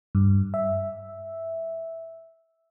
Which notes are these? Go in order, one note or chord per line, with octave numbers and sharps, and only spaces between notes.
G2
E5